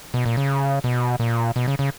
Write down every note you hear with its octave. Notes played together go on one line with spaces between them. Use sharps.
B2
A#2
C#3
B2
A#2
B2
C#3
C#3